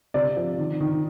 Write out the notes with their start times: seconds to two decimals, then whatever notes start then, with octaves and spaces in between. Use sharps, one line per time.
0.14 C3 D5
0.37 F3
0.58 D#3
0.80 D#3